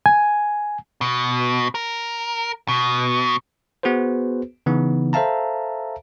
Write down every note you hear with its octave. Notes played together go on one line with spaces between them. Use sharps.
G#5
B2
A#4
B2
B3 F#4 G#4 B4 C5
C#3 E3 B3 D#4
A4 C5 E5 F5 A5 A#5